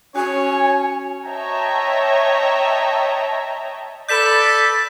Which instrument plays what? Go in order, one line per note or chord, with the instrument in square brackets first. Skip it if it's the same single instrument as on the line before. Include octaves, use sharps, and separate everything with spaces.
[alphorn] C#4 [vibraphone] F#4 [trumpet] C#5 [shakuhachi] G#5
[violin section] C#5 D#5 E5 G5 A5 A#5
[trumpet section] A4 B4 D5 [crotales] G6 B6 E7